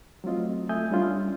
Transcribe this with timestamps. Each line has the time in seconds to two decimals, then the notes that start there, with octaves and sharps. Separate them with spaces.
0.24 F#3 A3 C4 F4 D#5
0.69 A3 E5 G#5 D#6 G6
0.91 G3 C#4 D4 F4